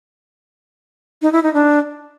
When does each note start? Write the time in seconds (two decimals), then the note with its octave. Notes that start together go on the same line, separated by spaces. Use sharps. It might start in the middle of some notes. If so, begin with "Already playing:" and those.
1.22 D#4
1.33 E4
1.43 D#4
1.54 D4